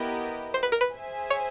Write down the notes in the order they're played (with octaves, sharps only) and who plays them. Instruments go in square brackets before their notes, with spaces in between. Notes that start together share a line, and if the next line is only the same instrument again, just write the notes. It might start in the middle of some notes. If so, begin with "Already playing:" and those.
Already playing: [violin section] B3 E4 G4 A#4 D#5
[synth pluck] C5
B4
A#4
B4
[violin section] G#4 C5 E5 G#5
[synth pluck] C#5